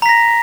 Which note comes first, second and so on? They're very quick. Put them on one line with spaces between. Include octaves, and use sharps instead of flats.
A#5 B6 A#6